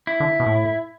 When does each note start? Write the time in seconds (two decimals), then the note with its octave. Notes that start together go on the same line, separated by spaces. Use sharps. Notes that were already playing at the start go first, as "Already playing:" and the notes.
0.07 E4
0.20 D3
0.40 B2
0.46 A2